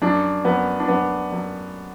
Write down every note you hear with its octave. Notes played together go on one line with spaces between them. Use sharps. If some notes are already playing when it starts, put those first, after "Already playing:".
F#2 D4
F#2 B3
D4
F#2 B3
F#2